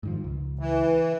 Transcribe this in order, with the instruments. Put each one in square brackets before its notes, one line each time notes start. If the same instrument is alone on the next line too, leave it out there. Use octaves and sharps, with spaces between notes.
[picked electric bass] G#2 D#3 F3
C#2
[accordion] E3